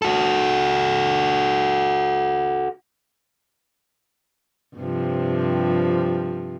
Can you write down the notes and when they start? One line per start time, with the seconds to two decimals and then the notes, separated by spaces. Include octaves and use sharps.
0.02 F#4 A4
4.76 G2 C3 F3